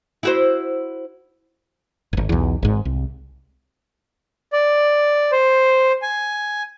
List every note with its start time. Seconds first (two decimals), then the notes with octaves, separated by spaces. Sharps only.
0.23 E4 F#4 C5
2.13 D#1 G#1
2.29 B1 E2
2.63 G#1 G#2
2.85 C2
4.53 D5
5.32 C5
6.02 G#5